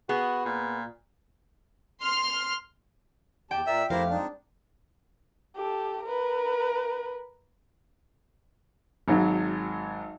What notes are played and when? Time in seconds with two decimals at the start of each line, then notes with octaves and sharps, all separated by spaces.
0.09 B3 F#4 G#4
0.45 A#2
1.99 C6 F6
3.51 E2 G4 G5 A5
3.67 A#2 A#4 D5 E5 E6
3.90 F2 F3 A3 E4 G4 A#4 C5 F5
4.09 G#3 C4 D4 D#4
5.56 G4 A4
6.03 A#4 B4
9.08 G#1 G#2 F#3